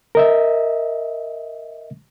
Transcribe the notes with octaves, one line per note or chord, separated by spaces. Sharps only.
A#4 D#5 E5